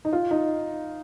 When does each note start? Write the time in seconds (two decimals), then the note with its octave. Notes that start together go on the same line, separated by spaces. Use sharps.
0.05 D#4
0.13 F4
0.31 D#4